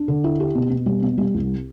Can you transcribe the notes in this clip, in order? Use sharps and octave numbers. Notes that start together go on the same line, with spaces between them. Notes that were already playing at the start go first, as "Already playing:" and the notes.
Already playing: D4
D3
E4
G4
B2
B2
G3
B2
G3
C2